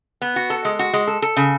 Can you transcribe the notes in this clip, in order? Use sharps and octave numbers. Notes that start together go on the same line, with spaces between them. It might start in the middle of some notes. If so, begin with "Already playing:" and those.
B3
F#4
A4
G#3
F#4
G#3
A4
A4
C#3